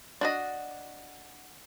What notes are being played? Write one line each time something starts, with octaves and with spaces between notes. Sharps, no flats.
D4 F#4 D#5